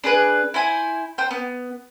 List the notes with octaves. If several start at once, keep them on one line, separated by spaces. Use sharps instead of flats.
D4 G#4 B4
E4 C5 G#5
C5 G5
B3